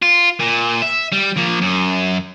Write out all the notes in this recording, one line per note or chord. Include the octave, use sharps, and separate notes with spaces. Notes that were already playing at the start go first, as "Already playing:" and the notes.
F4
A#2
E5
G3
F3 A#3
F#2